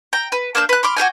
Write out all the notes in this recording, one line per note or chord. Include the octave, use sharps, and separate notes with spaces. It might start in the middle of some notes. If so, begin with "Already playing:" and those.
G5 A#5
B4
A#3 D4 E6 G6
B4 F#6
B5 C6 D6 F6
F#4 G#4 G5 G#5